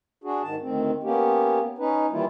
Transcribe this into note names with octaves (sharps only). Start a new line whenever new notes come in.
D4 F#4 G#4
G#2 D#3 A5
D2 D#3 C4
A#3 B3 C#4 G4
C#4 D#4 B4
D#3 E3 G3 A#3 E4 F4